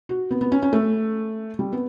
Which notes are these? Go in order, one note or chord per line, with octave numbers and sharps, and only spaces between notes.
F#4
B3
B3
C#4
C#4
A3
G3
B3